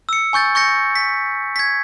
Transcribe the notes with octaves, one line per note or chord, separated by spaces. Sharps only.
E6 C#7
G#5 C#6 G6 A6
C#6 G6 A#6 C#7
B6
G#6 B6